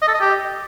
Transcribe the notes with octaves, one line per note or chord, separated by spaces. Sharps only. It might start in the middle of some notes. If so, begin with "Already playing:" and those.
D#5
A4
D#5
G4